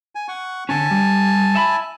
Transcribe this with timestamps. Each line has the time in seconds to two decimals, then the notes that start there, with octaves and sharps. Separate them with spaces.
0.15 G#5
0.28 F#5 C#6
0.69 D3 C#4 G#5 A5
0.91 G3
1.55 E5 B5